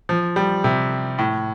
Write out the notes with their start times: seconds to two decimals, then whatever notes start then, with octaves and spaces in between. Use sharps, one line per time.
0.09 F3
0.36 G3
0.64 C3
1.18 A2